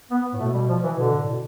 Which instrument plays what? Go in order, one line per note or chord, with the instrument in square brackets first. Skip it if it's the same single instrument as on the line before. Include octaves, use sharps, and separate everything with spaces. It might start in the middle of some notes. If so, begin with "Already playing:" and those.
[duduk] B3
[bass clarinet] A2
[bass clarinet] B2 [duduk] A3
[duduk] G3
F3
E3
[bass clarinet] B2 [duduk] D3
[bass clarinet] A2
B2